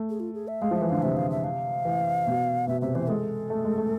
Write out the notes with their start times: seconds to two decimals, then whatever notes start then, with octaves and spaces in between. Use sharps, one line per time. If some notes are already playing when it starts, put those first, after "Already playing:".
Already playing: A3
0.10 G#4
0.20 F4
0.34 G#4
0.48 E5
0.62 G#3 F5
0.71 F3 E5
0.82 E3
0.89 D3 F5
1.02 C3 E5
1.17 F5
1.30 E5
1.44 F5
1.85 E3
2.27 B2
2.67 B2 E5
2.81 C3 E5
2.95 E3 C5
3.09 G#3 A4
3.50 A3
3.64 G#3
3.78 A3